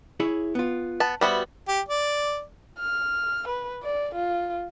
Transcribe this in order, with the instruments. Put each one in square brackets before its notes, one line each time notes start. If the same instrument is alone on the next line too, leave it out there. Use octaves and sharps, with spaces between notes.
[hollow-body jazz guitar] E4 G#4 C#5
B3 F4
[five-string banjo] B3 A5
[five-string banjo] G3 B3 F#4 [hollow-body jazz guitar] C5 E5
[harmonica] G4
D5
[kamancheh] F6
B4
D5
F4